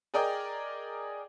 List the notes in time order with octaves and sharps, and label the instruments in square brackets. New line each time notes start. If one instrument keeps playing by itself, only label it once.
[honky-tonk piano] G#4 A#4 D5 D#5 G5